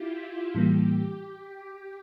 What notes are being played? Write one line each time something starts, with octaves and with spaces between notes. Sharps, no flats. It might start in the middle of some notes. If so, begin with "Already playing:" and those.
Already playing: E4 F4 G4
F4
A2 E3 G3 A#3 G4